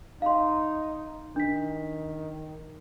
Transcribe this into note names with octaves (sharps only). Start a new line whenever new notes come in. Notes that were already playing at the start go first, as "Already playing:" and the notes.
D#4 F5 C6
D#3 D4 B6